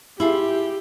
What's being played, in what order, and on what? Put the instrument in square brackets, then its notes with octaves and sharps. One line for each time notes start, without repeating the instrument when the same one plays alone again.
[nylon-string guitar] E4 F4 G#4 [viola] G4